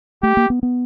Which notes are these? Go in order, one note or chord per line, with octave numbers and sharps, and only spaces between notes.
A3 G4
A#3
B3
B3